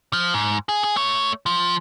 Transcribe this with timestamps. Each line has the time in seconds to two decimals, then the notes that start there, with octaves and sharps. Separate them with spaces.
0.13 F3
0.34 G#2
0.69 G#4
0.84 G#4
0.96 A3 C#5
1.46 F3